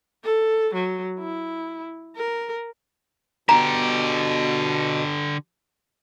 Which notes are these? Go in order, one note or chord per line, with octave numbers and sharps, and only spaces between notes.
A4
F#3
E4
A#4
B2 D3 G4 A#5